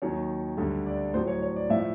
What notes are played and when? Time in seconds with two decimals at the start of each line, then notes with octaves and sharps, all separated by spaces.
0.02 D#2 D#3 F#3 C#5
0.57 D2 D3 G3
0.86 D5
1.14 A2 C5
1.17 F#3
1.27 C#5
1.42 C#5
1.56 D5
1.70 A2 F3 E5